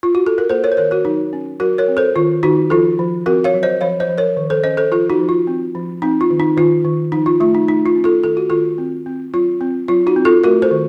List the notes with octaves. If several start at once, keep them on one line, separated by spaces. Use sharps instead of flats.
F4
F#4
A4
A#4
A#3 A4 C5
A#4 C#5
C5
D#3 A#4 C#5
F#4 A#4
F#3 D#4
C#4
F#3 F#4 A#4
A#4 C#5
C4
A4 C5
D#3 F4
D#3 D#4 F#4
F3 F4 A4
F3
C4 F#4 A#4
C#5 F5
F#3
C5 D#5
F3 C#5 F5
C5 D#5
F3
A#4 C#5
D#3
A4 C5
C#4 C5 D#5
A4 C5
F3 F4 A4
D#4 F#4
F3
F4
C4
F3
C4 D#4
F4
D#3
D#4
D#3 F4
D#3
F3 D#4
F4
A3 F4
D#4
A3 D#4
F4
C#4
F4 A4
D#3 A4
F#4
D#3 F4 A4
C4
C4
F#3 F4
C4
F#3 F4
D#4 F#4
C4
F4 A4
A3 F#4 A#4
A4 C5
D#3